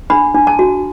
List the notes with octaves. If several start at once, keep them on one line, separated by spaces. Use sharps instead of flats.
D4 B5
D4
A5
F#4